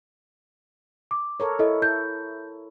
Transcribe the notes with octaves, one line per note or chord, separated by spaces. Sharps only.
D6
A4 A#4 C#5
E4 A4 D#5
E4 A4 G6